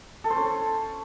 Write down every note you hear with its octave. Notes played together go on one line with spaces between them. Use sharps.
A4
C5
C#4